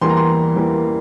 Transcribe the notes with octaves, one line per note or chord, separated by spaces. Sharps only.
E2 E3 G3 A#3 C6
A#5
C6
E2 E3 G3 A#3